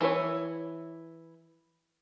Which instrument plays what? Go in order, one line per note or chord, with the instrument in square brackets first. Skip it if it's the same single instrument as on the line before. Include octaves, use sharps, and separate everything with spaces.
[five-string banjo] E3 E4 B4 C#5